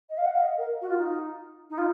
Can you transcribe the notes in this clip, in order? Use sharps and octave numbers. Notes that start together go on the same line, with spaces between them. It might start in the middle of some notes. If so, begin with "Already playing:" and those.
D#5
F5
F#5
F5
D#5
A#4
F#4
F4
D#4
D#4
F4